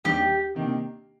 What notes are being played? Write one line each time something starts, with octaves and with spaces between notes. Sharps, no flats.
D#2 D#3 G3 D4 G4
C3 D#3 A#3 D4